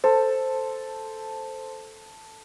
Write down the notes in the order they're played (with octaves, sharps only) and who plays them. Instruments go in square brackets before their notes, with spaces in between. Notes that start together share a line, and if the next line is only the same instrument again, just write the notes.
[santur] A4 [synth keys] C5